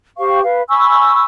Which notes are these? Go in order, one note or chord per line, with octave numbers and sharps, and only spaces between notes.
G4 C5 F5 C#6
B4 F5
G#5 B5 C#6 E6